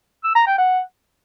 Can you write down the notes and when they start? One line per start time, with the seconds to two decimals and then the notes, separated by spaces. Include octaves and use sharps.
0.24 E6
0.35 A#5
0.47 G5
0.58 F#5